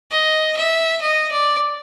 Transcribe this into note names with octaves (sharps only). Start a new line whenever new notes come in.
D#5
E5
D#5
D5